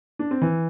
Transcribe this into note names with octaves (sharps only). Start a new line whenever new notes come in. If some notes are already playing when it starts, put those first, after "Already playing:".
D4
C4
E3